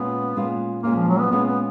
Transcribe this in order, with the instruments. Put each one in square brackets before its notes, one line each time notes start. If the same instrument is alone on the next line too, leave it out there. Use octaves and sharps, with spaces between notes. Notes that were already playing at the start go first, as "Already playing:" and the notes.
Already playing: [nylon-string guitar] A#2 G#3 C#4 F4 [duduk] B3
[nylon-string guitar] A#2 G#3 C#4 F4
[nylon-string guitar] A#2 G#3 C#4 F4 [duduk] A#3
[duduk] F3
F#3
B3
[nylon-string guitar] A#2 G#3 C#4 F4 [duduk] B3
[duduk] B3